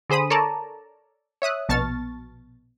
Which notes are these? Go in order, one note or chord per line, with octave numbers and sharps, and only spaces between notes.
D3 G#4 C5 B5 D#6
A4 A#4 C#5 D5 A5 A#5
C#5 E5 D#6 F#6
A#1 B2 A5 C#6 F6 A6